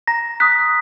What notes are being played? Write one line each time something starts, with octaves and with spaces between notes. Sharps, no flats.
A#5 A#6
D#6 F#6 B6